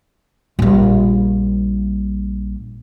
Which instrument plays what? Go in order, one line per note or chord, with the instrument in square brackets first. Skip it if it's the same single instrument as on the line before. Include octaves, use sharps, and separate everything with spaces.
[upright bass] A#1 G3